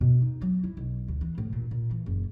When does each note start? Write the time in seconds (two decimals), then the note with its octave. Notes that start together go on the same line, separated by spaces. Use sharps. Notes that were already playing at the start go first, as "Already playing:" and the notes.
0.01 B2
0.22 D#4
0.42 F#3
0.64 E4
0.77 B1
1.08 D2
1.21 E3
1.38 A2
1.53 A#2
1.71 A#2
1.91 E3
2.06 F#1